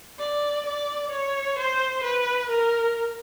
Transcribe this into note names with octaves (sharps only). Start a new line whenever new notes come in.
D5
D5
C#5
C5
B4
A#4